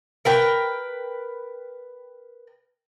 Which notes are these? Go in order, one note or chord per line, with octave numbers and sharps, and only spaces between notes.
A#4 B4 G5